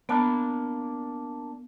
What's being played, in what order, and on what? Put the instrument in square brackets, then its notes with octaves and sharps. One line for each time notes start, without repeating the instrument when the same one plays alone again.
[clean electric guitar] A#3 D4 [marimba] B3 A5 B5